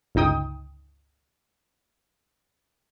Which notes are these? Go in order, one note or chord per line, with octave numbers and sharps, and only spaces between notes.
G1 C#2 D#4 G5 D#6